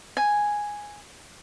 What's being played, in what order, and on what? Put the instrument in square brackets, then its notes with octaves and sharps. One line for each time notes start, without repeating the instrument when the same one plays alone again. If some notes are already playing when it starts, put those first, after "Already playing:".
[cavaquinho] G#5